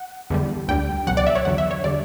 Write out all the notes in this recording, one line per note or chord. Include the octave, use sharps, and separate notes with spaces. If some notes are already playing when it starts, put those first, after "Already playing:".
Already playing: F#5
E2 D3 G3
D2 D3 G3 G5
C#2 B2 F#3 F#5
D5
E5
C#5
E2 D3 F#3 F#5
E5
C#5
D3 G3 D5